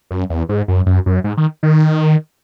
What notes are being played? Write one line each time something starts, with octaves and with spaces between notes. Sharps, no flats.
F#2
E2
G#2
F#2
F#2
F#2
G#2
D#3
D#3